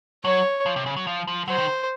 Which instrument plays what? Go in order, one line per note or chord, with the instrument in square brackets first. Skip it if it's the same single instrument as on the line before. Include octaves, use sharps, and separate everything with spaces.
[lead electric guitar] F#3 [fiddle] C#5
[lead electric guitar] F3
C3
C#3
F#3
F3
F3
[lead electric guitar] F#3 [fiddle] C5
[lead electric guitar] D#3